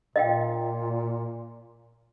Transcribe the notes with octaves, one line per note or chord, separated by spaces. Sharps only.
A#2 D#5 F5 G5